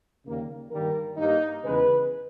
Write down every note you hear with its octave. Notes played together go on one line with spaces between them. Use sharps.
D#2 C#3 G3 A#3
G2 D#3 G3 A#3 A#4
G2 G3 A#3 D#4
E2 C#3 G#3 B4